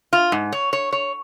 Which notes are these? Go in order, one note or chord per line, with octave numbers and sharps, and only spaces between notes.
F4
G#2
C#5
C#5
C#5